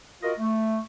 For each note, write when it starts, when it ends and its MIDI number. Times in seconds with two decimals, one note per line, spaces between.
0.23 0.33 65
0.23 0.33 66
0.23 0.33 70
0.23 0.33 75
0.39 0.79 57